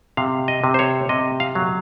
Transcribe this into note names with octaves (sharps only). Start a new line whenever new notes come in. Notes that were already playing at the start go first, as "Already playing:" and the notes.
C3 F5
D#5
C3
C5
C#5
C3 D#5
F5
F#3